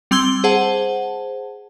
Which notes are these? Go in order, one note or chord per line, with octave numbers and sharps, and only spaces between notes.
G3 C4 C6 E6 G#6 G7
G#4 C5 F#5 A5